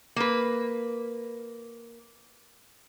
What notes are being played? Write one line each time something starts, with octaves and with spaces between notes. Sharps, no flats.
A#3 B4